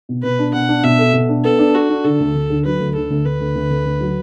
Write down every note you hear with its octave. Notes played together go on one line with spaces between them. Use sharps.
B2
B2 B4
D4
B2 F#5
D4
B2 E5
A4
B2
D4
B3 A4
D4
F#4 A4
D4
D3 A4
D2
D2
D3
F#3 B4
D2
D3 A4
D2
D2 B4
D2
D2
D2
D2
F#3